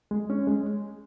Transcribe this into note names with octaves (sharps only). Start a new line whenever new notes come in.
G#3
C#4
G#3